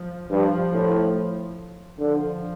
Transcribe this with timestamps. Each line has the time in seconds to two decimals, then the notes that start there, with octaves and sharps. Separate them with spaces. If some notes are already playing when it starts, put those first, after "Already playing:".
Already playing: F3
0.30 G2 F3
0.74 A2
2.00 D3 F3